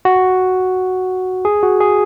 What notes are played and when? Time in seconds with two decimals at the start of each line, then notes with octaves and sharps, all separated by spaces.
0.05 F#4
1.45 G#4
1.63 F#4
1.80 G#4